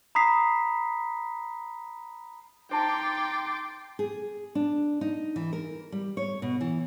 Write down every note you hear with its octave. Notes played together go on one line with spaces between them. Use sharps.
A#5 B5 D#6 B6 C7
D#4 C5 G5 A5 C6 D6 A6
G#4
D4
D#4
E3
A#4
G3
C#5
B2
E3